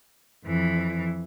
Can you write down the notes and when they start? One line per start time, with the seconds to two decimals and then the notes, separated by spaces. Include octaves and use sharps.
0.45 F2 E3